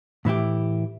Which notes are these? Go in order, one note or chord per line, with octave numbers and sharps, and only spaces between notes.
A2 E3 E4 G4